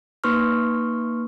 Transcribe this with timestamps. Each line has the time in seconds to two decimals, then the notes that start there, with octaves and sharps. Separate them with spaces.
0.24 A#3 D#4 B4 C6 C#6 F6